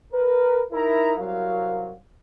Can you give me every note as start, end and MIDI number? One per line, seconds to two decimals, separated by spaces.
0.13 0.61 70
0.13 0.61 71
0.72 1.12 63
0.72 1.12 64
0.72 1.12 70
0.72 1.12 82
1.17 1.93 36
1.17 1.93 54
1.17 1.93 70
1.17 1.93 77